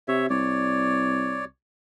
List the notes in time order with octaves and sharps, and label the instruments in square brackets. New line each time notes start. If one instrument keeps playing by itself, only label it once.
[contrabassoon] C3 [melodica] C#5 E5
[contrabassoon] C2 [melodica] C#5 D5